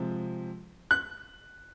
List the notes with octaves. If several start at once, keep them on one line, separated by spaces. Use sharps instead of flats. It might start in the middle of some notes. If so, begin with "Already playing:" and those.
Already playing: C3 F3 G#3
F#6